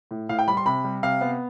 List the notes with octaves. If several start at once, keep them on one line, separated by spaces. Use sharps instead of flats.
A2
A2 F5
G5
G3 B5
C6
C3 B5
G3
C3 F5
B3